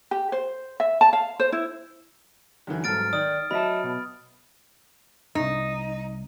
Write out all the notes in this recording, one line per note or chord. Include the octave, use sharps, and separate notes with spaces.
G4
C5
E5
A5
F5
C5
E4
F#2 D3 E3
C2 G#2 F#3 A4 F6 A6 D7
D#3 D5 D#6
F#3 D#5 E5 A5 B5
B2
C2 F#2 D#4